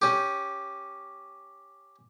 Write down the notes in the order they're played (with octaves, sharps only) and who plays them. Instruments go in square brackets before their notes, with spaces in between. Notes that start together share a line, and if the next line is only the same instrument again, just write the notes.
[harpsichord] C#4 G4